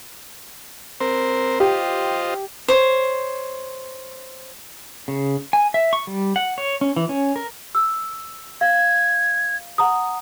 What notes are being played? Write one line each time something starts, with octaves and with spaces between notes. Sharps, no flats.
C4 A#4 C5
F4 G4 C5 D#5
C5 C#5
C#3
G#5
E5
C#6
G3
F#5
C#5
C#4
E3
C#4
A#4
E6
F5 G#6
F#5 A#5 D#6